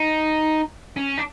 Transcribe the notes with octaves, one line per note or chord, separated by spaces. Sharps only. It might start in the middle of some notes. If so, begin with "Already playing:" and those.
Already playing: D#4
C#4
D4